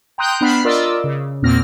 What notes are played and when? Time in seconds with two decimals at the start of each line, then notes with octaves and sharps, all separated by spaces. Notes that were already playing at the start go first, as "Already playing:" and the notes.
0.18 G5 A#5 C6 D#6 F#6 G6
0.41 B3 D4 B5 F6 B6 C7
0.64 F4 A#4 D5 D#5 D6 E6
1.04 C#3
1.42 E2 A#2 A#3 C4 F6 A#6